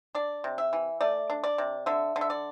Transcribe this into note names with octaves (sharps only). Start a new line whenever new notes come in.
D4 D5
C3
E5
E3
A3 D5
D4
D5
C3
D3 E5
D3
E5
D5